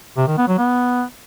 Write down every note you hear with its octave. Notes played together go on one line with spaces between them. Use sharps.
C3
D#3
B3
F#3
B3